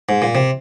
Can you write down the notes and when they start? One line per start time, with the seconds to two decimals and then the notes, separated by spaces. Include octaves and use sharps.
0.09 G#2
0.22 A#2
0.35 C3